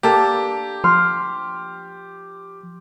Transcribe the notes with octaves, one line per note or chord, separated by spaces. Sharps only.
A#3 D4 G4 A4
F3 C6 F6